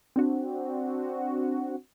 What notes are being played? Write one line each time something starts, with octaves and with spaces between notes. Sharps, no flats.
C4 D4 F#4